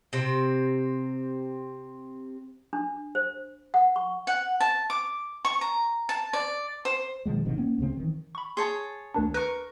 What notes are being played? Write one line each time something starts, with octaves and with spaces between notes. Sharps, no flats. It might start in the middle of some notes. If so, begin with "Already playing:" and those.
C3 C4
D4
C5
F#5
C#6
F#5
A5
D6
C#6
A#5
A5
D5
C5
B2 D#3 F3 G#3
A1 C3 D#3
A#3 C#4
D2 C#3 C4
D#3 E3
B5 C#6
G#4 C#5 A5 C6
D2 D#3 D4
A#4 B4 C#6